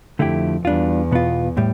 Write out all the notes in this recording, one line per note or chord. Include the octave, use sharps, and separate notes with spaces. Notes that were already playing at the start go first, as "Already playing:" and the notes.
F2 D3 A3 E4 G4
E2 G3 D4 F4
B2 B3 F4
A2 G3